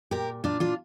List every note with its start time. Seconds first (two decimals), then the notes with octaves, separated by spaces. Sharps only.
0.11 A#2 G4 A#4
0.44 A#2 D4 F4
0.60 D4 F4